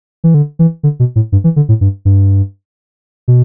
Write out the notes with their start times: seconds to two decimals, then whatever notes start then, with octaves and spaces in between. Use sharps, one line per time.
0.24 E3
0.34 D3
0.59 E3
0.83 D3
1.00 B2
1.16 A2
1.32 G2
1.44 E3
1.56 D3
1.69 A2
1.81 G2
2.05 G2
3.28 B2